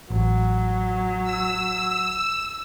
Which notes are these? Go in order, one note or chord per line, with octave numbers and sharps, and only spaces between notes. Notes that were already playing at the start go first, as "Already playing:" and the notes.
A1 F#3
E6